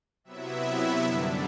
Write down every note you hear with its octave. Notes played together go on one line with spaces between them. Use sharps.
C3 F#3 B3 E4 E5
F#2 D3 G3 D4